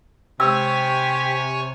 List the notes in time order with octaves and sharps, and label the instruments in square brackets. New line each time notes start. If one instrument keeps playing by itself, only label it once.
[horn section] C3 [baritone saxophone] G4 [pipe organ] C#5 G#5 C#6 [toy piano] E6